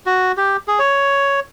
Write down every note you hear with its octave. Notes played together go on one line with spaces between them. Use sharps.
F#4
G4
G#4
C#5